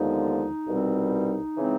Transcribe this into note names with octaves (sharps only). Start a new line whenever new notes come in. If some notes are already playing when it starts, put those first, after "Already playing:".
Already playing: D#2 D3 F3 G#3 B3 D#4
C2 B2 G3 C4
C#3 E3 G#3 C4